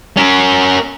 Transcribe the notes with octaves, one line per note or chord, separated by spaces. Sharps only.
C#4 A#4